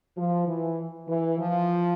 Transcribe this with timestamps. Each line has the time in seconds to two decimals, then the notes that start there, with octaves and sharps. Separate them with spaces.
0.17 F3
0.47 E3
1.08 E3
1.38 F3